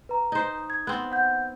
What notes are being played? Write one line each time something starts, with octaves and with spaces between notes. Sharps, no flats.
B4 A#5
D#4 C5
G#6
B3 C4 F#6
F#5 G6